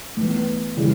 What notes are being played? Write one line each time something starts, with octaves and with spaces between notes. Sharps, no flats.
A2 E3 B3
C#3 E3 G3